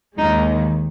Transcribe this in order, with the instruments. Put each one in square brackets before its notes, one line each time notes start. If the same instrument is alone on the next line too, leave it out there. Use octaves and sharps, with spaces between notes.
[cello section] D#2 D#3 G#3 D#4